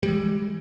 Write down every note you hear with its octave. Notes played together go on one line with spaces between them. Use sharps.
E3 G3 G#3